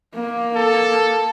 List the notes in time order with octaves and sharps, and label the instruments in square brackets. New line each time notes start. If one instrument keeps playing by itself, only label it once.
[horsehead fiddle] A#3
[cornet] A4